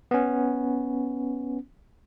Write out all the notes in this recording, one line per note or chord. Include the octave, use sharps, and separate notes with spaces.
B3 C#4